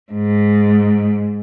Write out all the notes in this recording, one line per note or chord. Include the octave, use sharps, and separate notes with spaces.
G#2